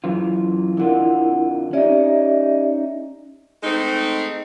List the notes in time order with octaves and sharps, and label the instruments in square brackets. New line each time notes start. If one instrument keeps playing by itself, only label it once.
[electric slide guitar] F#2 E3 F4
[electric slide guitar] F2 D3 F4 [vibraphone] E4 A#4 F#5
[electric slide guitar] C#4 D#4 [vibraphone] G4 D5 E5
[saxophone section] G#3 A3 C4 D#4